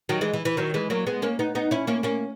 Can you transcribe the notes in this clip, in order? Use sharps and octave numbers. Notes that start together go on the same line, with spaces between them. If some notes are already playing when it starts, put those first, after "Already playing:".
D#3 F#3
E3 G#3
E3
E3
D#3 F#3
E3 G#3
F#3 A#3
G#3 B3
A#3 C#4
B3 D#4
B3 D#4
C#4 E4
A#3 C#4
A#3 C#4